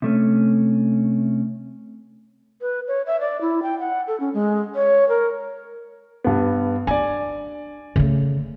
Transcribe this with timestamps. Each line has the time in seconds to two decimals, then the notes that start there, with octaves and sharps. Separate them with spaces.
0.02 C3 A3 C#4
2.61 B4
2.88 C#5
3.06 E5
3.20 D5
3.41 E4
3.63 G5
3.79 F#5
4.08 A4
4.20 C#4
4.34 G#3
4.75 C#5
5.09 A#4
6.24 G2 B3
6.87 D4 D5 G#5
7.96 C#3 A3